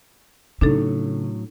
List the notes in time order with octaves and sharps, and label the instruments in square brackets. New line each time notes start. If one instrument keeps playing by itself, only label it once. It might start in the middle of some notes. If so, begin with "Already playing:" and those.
[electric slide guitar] A2 F#3 [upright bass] C#3 [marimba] D4 D#4 A4